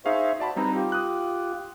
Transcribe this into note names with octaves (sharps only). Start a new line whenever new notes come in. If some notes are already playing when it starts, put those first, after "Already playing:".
D#4 G#4 C5 E5 F5 C#6
F#4 D5 A5 B5
G3 C4 D#4 B4 A#5
F4 G4
D#6 F#6